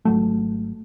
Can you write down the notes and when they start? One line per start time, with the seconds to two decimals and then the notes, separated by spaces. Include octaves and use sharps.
0.05 G#1 F#3 A3